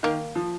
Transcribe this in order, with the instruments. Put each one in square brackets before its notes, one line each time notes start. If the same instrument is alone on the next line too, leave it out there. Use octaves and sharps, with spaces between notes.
[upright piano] D#3 [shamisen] A#3
[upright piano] F3